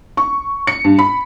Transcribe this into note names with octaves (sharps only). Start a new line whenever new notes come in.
C#6
C#7
G2
B5